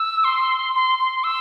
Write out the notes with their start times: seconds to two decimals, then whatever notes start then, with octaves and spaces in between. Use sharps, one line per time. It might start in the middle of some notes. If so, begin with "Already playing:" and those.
Already playing: E6
0.24 C6
0.75 C6
0.99 C6
1.24 E6